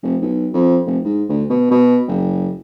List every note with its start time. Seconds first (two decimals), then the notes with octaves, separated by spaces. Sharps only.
0.03 F1
0.22 B1
0.54 F2
0.87 F1
1.05 G#2
1.29 D2
1.50 B2
1.71 B2
2.08 F#1